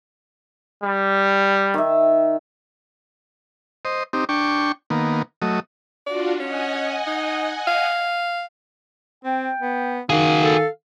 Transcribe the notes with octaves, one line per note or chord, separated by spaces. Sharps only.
G3
D#3 E5
C5 D#5
C4 D#4 G4
D4 G5 C#6
D#3 A#3 B3
F#3 A3 D#5
D4 F4 F#4 D5
C#4 D#5 F#5 G#5
D#4
F5
C4 G5
B3
D#3 F#4 G#4 F5
A4